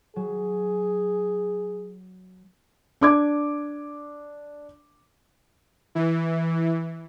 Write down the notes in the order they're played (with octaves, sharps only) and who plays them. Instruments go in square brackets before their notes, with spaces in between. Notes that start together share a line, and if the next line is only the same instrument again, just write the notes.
[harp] F#3 [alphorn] G#4
[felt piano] D4 D6 G#6
[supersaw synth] E3